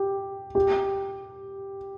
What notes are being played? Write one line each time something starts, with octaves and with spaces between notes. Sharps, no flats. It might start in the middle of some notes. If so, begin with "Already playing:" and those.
Already playing: G4
G4